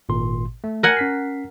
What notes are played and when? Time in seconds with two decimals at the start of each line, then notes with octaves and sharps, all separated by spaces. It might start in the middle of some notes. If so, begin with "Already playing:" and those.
0.09 G#1 A#2 C6
0.64 A3
0.83 A#4 F#5 G#5
0.97 C#4 B6 C7